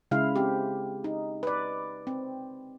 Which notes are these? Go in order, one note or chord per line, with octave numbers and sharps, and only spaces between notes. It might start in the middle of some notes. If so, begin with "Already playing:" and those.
C#3 G#3 E4 F5
C4 G4
D#4
B4 D5
C4